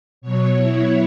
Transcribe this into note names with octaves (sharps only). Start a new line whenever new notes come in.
B2 F#3 C#5
E4